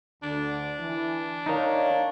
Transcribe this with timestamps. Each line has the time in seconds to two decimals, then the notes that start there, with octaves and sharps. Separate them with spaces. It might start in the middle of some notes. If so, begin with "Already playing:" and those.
0.23 D2 D3 D4
0.80 E3 E4
1.46 D#4 A#4 C#5 D5 F5